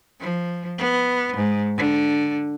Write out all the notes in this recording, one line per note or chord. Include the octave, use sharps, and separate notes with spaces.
F3
B3
G#2
D3